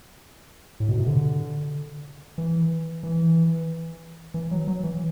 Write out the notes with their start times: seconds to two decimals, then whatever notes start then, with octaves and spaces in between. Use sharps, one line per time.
0.80 A2
0.89 B2
0.98 C3
1.06 D3
2.38 E3
3.03 E3
4.34 E3
4.51 F#3
4.67 F#3
4.83 E3